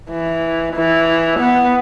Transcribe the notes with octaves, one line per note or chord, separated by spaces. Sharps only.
E3
E3
B3